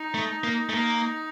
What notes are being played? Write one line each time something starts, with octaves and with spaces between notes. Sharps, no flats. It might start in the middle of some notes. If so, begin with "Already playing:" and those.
Already playing: D#4
A3
A#3
A3
A#3